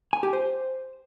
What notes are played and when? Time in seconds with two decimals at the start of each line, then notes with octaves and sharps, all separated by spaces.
0.13 G#5
0.23 G4
0.33 C5